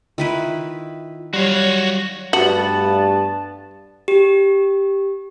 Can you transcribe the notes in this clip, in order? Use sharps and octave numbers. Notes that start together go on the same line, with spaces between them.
D#3 E4 F4 B4
F#3 G3 F#4 C#5 F5
G2 A3 B3 F#4 A5
G4